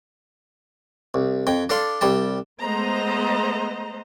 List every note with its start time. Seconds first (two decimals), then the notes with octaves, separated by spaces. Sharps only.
1.14 C2
1.47 F2 G5
1.69 D4 A4 D5 F5 C6
2.01 C2 G3 G5 A5
2.62 G#3 A3 B3 C5 D#5 A#5